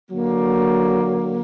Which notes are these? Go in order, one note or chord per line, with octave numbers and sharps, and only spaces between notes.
D3 F#3 A#3